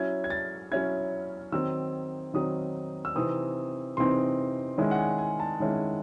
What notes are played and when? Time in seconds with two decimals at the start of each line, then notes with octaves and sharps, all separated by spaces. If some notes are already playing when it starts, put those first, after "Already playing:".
Already playing: F#3 C#4 E4 G#6
0.24 G#6
0.30 A6
0.72 F#3 C#4 E4 G#6
1.52 D#3 F#3 C4 D#4 E6
2.34 D#3 F#3 C4 D#4 D#6
3.05 E6
3.15 C3 E3 C4 D#4 D#6
3.97 C3 E3 C4 D#4 C6
4.78 D#3 G#3 C#4 E4 G#5
4.91 F#5
4.99 G#5
5.18 G#5
5.40 A5
5.60 D#3 G#3 C#4 E4